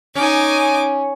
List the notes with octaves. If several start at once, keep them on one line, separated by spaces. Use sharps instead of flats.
C#4 D#4 G#5 D6